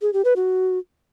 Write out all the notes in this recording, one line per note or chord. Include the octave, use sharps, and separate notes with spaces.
G#4
G4
B4
F#4